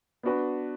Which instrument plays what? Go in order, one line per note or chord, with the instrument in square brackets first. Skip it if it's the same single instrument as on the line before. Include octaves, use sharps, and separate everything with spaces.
[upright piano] B3 D4 F#4 B4